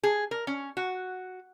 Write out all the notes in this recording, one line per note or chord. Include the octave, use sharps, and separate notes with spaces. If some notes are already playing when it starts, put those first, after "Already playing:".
G#4
A#4
C#4
F#4